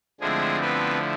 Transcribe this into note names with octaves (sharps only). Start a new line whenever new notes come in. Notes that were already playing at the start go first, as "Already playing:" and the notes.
D3 F3 G#3 A3 C4 E4 G#4
B3 B4